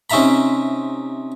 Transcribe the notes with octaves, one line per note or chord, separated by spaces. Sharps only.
C3 C#4 D#4 E5 A#5 B5